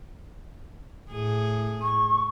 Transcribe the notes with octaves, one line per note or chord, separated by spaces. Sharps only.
A2 G#4
C#6